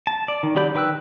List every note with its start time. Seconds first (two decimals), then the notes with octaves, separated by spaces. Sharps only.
0.07 A5
0.28 D5
0.43 D#3
0.56 F#3 G4 D5 B5 G6
0.75 D#3 B4 G5 E6 F#6